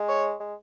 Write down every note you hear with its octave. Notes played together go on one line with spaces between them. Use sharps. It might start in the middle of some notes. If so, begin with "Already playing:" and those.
Already playing: G#3
C#5
G#3